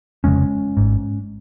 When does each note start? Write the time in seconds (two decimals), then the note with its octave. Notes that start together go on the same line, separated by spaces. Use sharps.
0.24 F1 F2 C#3 G#3 C#4
0.77 G#1 G#2